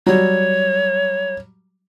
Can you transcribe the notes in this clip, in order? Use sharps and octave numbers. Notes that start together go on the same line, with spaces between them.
F#3 G3 C#5